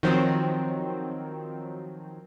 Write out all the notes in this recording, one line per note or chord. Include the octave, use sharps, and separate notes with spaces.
D#3 F3 F#3 C4